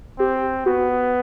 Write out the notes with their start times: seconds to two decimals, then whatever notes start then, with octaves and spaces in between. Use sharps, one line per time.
0.19 C4 G4
0.66 B3 F#4